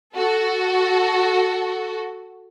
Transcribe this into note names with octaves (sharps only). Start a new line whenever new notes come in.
F#4 A4